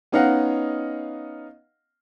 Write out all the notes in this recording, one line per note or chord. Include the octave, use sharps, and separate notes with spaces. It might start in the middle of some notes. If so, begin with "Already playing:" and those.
B3 C#4 D#4 D#5 F5 F#5